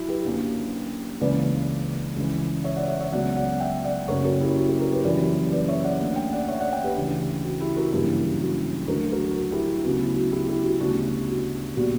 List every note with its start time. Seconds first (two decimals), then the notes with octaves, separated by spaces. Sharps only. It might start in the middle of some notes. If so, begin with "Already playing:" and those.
Already playing: F#3 E4 F#4
0.09 G4 B4
0.25 F#2 D3 A#3 C#4
1.21 C#2 C#3 E3 A#3 C#4 B4 D5
2.17 C#2 C#3 E3
2.64 C#5 E5
2.76 D5 F#5
2.88 C#5 E5
3.01 C#5 E5
3.13 C#2 C#3 F#3 B3 D5 F#5
3.36 D5 F#5
3.60 E5 G5
3.84 D5 F#5
4.08 F#1 F#2 C#3 A#4 C#5
4.25 F#4 A#4
4.40 E4 G4
4.57 F#4
4.69 E4 G4
4.80 F#4 A#4
4.92 G4 B4
5.04 F#1 F#2 E3 G3 B4 D5
5.52 B4 D5
5.68 C#5 E5
5.84 D5 F#5
6.00 D2 D3 A#3
6.16 E5 G5
6.33 D5 F#5
6.48 C#5 E5
6.60 D5 F#5
6.72 E5 G5
6.84 G4 B4
6.96 D2 C#3 E3
7.44 F#4
7.60 E4 G4
7.76 F#4 A#4
7.92 G1 F#2 C#3 E3 A#3 E4 G4
8.40 F#4
8.88 D2 D3 F#3 F#4 A#4
9.12 F#4 A#4
9.24 F#4
9.36 F#4
9.52 E4 G4
9.84 D2 C#3 F#3 B3 F#4
10.00 E4
10.16 F#4
10.32 E4 G4
10.48 E4 G4
10.64 F#4
10.80 D2 C#3 G3 B3 D4 F#4
11.28 F#4
11.76 A#2 G3 B3 F#4